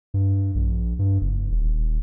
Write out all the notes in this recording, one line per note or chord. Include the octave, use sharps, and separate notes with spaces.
G2
A#1
G2
F#1
D#1